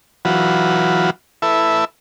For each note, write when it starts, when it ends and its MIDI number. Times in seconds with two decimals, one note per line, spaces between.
0.25 1.10 52
0.25 1.10 54
0.25 1.10 65
0.25 1.10 66
0.25 1.10 71
1.42 1.85 64
1.42 1.85 69
1.42 1.85 71
1.42 1.85 76